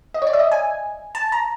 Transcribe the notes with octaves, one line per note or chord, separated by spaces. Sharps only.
D#5
C#5
D5
E5
D#5
G#5
A5
A#5